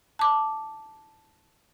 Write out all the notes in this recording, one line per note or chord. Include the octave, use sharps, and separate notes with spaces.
A5 D6